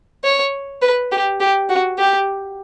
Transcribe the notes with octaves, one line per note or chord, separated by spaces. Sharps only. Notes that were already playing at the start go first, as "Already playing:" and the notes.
C#5
B4
G4
G4
F#4
G4